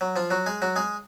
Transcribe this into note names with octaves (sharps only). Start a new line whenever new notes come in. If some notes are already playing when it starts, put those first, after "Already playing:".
F#3
F3 F4
F#3 F#4
G#3 G#4
F#3 F#4
G#3 G#4